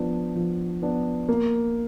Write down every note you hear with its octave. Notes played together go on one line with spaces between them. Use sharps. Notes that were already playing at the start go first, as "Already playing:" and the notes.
Already playing: F3 B3 D4
F3
B3 D4
A#3